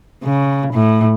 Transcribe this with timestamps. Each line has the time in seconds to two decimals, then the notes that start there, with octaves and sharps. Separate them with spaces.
0.24 C#3
0.73 A2